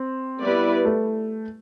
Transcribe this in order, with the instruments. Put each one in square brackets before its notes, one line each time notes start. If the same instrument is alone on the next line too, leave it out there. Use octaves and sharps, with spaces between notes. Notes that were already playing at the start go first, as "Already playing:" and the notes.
Already playing: [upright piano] C4
[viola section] G3 B3 E4 B4 D5
[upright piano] A3